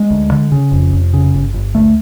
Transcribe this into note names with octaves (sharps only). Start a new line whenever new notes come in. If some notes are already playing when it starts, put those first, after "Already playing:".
Already playing: G#3
D2
D3
C#3
F1
F1
C#3
G1
G1
D2 A3